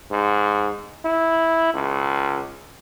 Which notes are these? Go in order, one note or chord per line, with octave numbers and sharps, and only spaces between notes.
G#2
E4
C#2